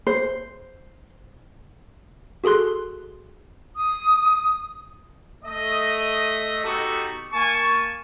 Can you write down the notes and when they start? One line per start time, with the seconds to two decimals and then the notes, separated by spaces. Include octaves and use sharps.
0.07 C5
2.44 F#4 G#4 A4 C6 F#6
3.76 D#6
5.45 A3 D#5
6.64 B3 D#4 F#4 G4 A4
7.33 A#3 G#5 A5 C#6